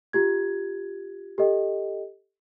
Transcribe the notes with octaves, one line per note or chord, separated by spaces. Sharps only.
F4 G4 G#6
G4 A4 D#5 G5